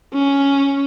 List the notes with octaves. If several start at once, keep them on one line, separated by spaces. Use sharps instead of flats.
C#4